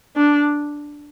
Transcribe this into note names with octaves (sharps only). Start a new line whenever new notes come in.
D4